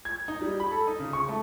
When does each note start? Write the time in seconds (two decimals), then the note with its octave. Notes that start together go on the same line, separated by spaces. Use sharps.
0.05 G#6
0.28 D#4
0.41 G3
0.60 B5
0.71 A4
0.87 D#4
1.00 C#3
1.13 C#6
1.28 A3